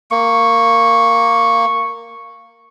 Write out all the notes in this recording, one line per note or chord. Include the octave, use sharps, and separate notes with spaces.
A#3 C#6